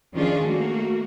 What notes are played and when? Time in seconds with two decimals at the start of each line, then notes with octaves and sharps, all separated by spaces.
0.14 D#3 F3 C#4 D4 F4 G#4
0.44 A3 A#3 F#4